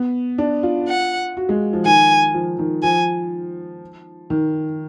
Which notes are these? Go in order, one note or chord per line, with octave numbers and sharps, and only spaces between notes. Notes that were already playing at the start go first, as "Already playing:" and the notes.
Already playing: B3
D4
F4
F#5
F#4
G#3
F3
D#3 G#5
F3
D#3
F3 G#5
D#3